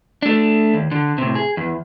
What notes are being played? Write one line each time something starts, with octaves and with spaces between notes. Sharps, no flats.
A3 D4
D#2
D3
A2 C3
G#4
E2